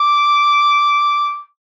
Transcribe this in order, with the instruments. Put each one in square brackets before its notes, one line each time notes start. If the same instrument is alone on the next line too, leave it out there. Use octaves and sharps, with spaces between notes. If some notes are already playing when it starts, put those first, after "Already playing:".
Already playing: [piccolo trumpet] D6